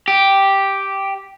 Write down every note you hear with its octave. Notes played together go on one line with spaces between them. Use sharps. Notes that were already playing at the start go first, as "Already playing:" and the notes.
G4